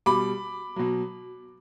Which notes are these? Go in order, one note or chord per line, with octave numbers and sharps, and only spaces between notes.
B2 G3 B5 D6
B2 F#3